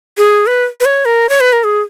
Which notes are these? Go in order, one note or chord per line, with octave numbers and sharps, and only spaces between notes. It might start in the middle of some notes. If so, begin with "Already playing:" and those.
G#4
B4
B4
C#5
A#4
C#5
B4
A#4
G#4